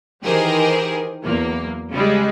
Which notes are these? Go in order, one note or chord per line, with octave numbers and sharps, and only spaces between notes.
D#3 E3 G4 G#4 A#4 C5
E2 F#3 A#3
C#3 G3 G#3